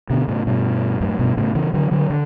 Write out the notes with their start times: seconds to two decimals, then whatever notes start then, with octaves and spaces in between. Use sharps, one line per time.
0.10 B2 D3
0.28 A2 C#3
0.47 G2 B2
1.01 F#2 A2
1.19 G2 B2
1.37 A2 C#3
1.55 C#3 E3
1.74 D3 F#3
1.91 D3 F#3
2.10 D3